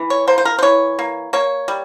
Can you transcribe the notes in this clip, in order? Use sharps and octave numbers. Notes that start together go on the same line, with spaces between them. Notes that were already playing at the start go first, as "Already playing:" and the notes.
Already playing: E3
C#5
A#3 C5
C5
A#4
C5
E3 C#5
A#3
A#3 C#5
G3